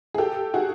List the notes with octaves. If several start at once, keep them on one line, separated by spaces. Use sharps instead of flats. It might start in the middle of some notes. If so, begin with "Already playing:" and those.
G#4
G4 A4
F#4 G#4